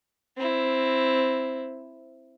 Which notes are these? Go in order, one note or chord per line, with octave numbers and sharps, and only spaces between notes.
C4 E4